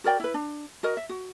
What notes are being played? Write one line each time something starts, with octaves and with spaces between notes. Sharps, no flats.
F#4 A#4 D5 G5
E4 B4
D4
F#4 A#4 D#5
E5
F#4